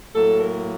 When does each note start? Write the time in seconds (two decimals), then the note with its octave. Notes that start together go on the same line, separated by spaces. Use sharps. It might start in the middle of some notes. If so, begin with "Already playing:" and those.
0.14 A2 F#3 A#3 A4
0.41 A#4